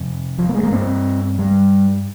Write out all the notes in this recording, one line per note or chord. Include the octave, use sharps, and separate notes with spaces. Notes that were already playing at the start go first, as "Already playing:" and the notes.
Already playing: F2 C3
F3
A#3
G#3
A#3
G2 C4
G3